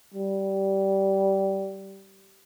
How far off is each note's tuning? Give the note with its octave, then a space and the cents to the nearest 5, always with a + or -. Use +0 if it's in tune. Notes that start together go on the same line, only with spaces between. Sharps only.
G3 -15